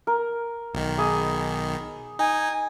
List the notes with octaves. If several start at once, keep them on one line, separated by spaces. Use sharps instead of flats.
A#4
B1 D#3
G#4 B5 D6
D#4 G#5